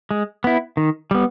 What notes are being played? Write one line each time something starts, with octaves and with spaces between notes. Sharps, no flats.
G#3
B3 E4
D#3
G3 B3